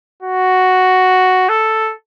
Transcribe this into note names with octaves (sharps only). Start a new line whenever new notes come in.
F#4
A4